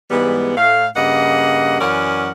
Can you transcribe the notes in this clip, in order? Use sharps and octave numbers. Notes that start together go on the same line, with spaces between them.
G#2 E3 G3 G#3 B3
A2 A3 F5
G2 C#3 A#3 D#5 F#5
F#2 E3 C#4 A#4 D5 F#5